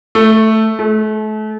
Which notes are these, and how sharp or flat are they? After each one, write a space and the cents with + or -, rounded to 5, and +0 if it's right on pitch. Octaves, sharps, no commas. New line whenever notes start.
A3 +0
A3 -35